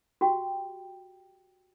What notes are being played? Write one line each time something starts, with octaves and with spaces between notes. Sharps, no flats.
F#4 G4 G5